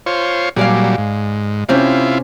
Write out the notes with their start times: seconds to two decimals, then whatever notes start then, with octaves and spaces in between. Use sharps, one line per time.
0.06 F4 C5 C#5
0.56 A#2 F#3 G3 G#4 D5 F5
0.98 G#2
1.69 C3 C4 C#4 E4 F4